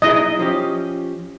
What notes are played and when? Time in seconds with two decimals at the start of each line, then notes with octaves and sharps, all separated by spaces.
0.02 B1 E4 G#4 D#5
0.39 F3 C#4 G4